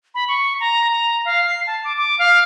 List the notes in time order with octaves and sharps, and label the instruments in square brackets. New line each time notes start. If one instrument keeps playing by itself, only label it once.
[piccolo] B5
C#6
A#5
A#5
F5
C7
A5
D6
D6
F5